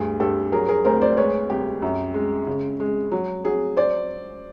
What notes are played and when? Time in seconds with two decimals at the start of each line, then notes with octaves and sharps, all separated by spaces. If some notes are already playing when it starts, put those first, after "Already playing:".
Already playing: D2 G2 G#4
0.20 G2 G4 A4
0.52 F#3 G#4 A#4
0.69 G#4 A#4
0.85 D2 A#4 C5
1.01 C5 D5
1.17 G#3 B4 C#5
1.50 C2 G4
1.82 F#2
2.14 G#3
2.47 C#3
2.80 G#3
3.12 F#3
3.44 F#3 G#4
3.77 C5 D5